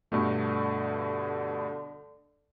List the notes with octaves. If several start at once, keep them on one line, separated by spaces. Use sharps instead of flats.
G2 B2 D3 A3